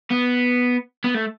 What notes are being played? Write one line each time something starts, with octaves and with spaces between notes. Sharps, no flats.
B3
B3
A3